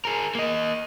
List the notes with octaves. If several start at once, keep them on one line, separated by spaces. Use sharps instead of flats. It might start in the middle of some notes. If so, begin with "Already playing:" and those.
G#4 A#4
A#3 D#5